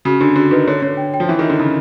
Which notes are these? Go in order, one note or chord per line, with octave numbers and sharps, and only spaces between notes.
C#3 F#4
D3 D4
D3 F#4
D#3 B4
D3 C#5
D3 C#5
G5
G5
F3
E3 E5
D#3
E5
D3
C#3 D#4